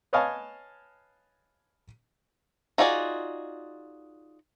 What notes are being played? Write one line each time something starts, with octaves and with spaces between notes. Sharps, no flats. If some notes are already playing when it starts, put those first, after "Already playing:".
B4 C#5 D#5 F5 G#5 A5
D#4 F4 F#4 G#4 D5